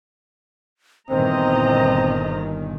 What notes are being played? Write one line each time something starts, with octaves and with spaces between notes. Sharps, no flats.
G1 A#2 D#3 E3 C4 C5 D#5 A#5